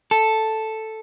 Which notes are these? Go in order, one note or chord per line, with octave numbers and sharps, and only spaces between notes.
A4